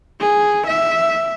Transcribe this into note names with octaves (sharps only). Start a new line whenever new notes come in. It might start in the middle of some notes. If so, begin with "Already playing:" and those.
G#4
E5